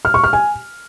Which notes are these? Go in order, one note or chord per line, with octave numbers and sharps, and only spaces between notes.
F6
C#6
F6
G#5